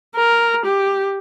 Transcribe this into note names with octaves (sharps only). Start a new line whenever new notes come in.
A#4
G4